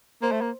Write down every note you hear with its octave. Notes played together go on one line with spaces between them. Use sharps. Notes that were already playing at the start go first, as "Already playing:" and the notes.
A#3 C5
A3
A#3